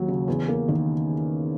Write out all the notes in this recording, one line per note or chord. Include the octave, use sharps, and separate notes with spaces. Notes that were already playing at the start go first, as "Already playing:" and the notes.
Already playing: D#2 F#3
C#3
E2
A#3
D#3